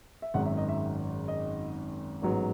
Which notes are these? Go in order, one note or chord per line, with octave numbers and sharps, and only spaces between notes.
E5
G#1 F#2 D#3 G#3 F#5
E5
D#5
E5
D#5
A1 G#2 F#3 B3